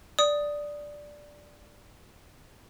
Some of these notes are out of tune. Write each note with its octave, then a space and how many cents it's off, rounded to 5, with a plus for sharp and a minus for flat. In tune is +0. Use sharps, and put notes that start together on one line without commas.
D5 +0 D#6 +0